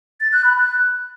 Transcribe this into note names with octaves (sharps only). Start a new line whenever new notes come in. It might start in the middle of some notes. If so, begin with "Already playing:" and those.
A6
F#6
B5
F#6